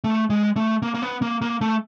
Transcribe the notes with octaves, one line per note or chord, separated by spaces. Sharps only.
A3
G#3
A3
A#3
A#3
B3
A#3
A#3
A3